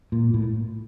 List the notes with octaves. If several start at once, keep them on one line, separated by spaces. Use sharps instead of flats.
A#2
A2